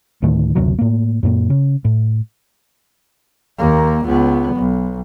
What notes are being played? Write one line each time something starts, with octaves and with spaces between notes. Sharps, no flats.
D2 A2 D#3 A3
F#1 D2 C3 F#3
A2 A#3
F#2 A#2 A#3
C#3
A2
D#2 A#3
C#2 B3
B1